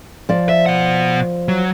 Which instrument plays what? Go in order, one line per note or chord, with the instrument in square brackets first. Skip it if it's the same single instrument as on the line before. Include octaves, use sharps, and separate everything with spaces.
[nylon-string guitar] F3 D5
[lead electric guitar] E5
B2 F#5
F#3